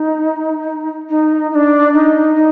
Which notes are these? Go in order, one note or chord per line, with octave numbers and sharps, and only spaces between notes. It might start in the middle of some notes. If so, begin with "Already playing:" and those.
Already playing: D#4
D#4
D#4
D4
D#4
D#4